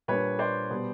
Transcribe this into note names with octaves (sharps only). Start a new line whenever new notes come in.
A#2 G3 A#3 D4 B4 C#5
C5 D5
B2 G3 B3